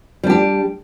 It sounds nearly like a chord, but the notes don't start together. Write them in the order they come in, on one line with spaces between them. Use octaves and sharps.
G3 D4 G4